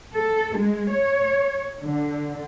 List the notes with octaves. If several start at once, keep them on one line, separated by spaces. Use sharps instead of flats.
A4
G#3
C#5
D3